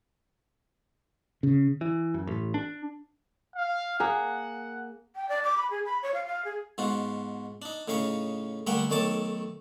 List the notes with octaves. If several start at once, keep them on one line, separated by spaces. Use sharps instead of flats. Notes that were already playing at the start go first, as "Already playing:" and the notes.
C#3
E3
F#2
A1
D4
F5
A#3 G#4 F#5
G5
D5
D6
B5
G#4
B5
C#5
F5
F5
G#4
G#2 B2 F4 F#4
D4 D#4
A2 C#3 D#4 F5 C#6
G2 D3 A3 A#3 F#5 G5
B1 D#3 A3 C#5 A5 D6